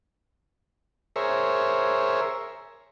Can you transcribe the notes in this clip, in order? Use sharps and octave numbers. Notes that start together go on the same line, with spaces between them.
G#4 A#4 C5 C#5 E5